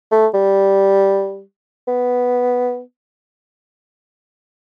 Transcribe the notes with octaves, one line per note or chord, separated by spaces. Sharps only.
A3
G3
B3